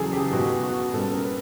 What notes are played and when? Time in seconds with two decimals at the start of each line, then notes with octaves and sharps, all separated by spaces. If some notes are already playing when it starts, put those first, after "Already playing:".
Already playing: E2 C#3 F#3 G#4 A4
0.13 G4
0.33 B2 G#3 B3 F#4
0.63 F#4
0.94 B2 G3 A#3 C#4 A4
1.14 A#4
1.24 B4